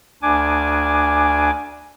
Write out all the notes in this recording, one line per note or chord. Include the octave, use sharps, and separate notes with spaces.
D2 D4 G#5 D6